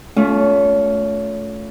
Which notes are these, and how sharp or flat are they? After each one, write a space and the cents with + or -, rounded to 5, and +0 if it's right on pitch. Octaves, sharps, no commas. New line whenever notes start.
A3 -15 C#4 +30 F4 +0